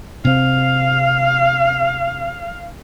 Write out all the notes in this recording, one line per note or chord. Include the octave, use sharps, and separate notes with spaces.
C3 C4 F5